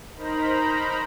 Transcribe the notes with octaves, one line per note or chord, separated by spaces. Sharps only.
D#4 A#4 C5 A#5 B5